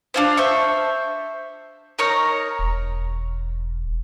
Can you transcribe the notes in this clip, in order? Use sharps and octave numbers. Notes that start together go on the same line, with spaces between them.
D4 F4 C5
C5 E5 C#6
D#4 A#4 C#5 D#6
E1